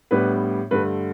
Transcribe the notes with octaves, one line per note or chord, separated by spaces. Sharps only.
A2 G3 B3 D4 B4
G2 D3 A3 B4